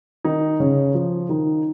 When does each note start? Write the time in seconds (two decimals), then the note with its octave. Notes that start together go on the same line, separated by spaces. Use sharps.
0.24 D#3 D#4
0.60 C#3 C#4
0.95 F3 F4
1.29 D#3 D#4